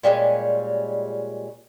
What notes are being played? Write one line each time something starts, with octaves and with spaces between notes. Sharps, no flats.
A#2 G3 G#3 C#4